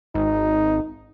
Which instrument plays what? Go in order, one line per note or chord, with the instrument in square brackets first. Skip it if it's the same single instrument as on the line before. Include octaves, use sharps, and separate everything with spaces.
[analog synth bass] G#1 [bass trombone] D#4